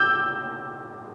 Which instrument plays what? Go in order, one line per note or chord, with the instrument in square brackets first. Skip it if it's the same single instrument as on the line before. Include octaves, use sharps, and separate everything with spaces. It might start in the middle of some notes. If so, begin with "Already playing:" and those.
Already playing: [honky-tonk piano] D6 E6 G6